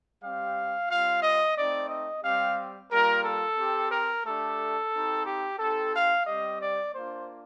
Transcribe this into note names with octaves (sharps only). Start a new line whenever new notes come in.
G3 C4 G4 F5
G3 C4 F4 F5
D#5
A3 C4 D#4 D5
D#5
G3 C4 G4 F5
G3 A#3 F4 A#4
A4
C4 G4
A#4
A3 D4 G4 A4
C4 D#4 G4
G4
C4 D#4 G4 A4
F5
G3 C4 G4 D#5
D5
A#3 D4 F4 C5